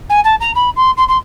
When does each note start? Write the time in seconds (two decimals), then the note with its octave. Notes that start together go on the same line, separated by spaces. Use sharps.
0.09 G#5
0.24 A5
0.40 A#5
0.55 B5
0.76 C6
0.97 C6
1.08 C6